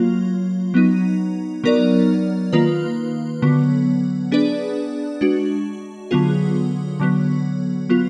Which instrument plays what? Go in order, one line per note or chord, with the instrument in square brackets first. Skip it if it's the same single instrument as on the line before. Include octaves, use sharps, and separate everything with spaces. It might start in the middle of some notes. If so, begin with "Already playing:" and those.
Already playing: [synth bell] F#3 A#3 F4
F#3 B3 D#4
F#3 B3 D#4 A#4 D5
D#3 A#3 F4 B4
D3 F#3 B3
B3 D4 G#4 B4 D5
G#3 D4 F#4
D3 F#3 B3 F4 G#4
D3 F#3 B3
F#3 B3 F4